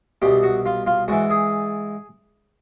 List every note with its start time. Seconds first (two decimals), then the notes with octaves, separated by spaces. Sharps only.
0.22 C2 B2 G4
0.43 F#4
0.66 F4
0.87 F4
1.08 G#2 E3 F#4
1.30 G#4